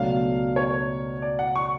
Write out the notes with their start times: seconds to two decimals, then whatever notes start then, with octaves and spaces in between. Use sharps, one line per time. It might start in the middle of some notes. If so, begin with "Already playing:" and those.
Already playing: C#2 B2 F#3 A3 D4 F5
0.56 C#5
1.22 D5
1.39 F#5
1.56 C#6